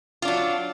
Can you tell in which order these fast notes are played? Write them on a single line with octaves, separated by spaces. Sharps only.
F4 D4 F#3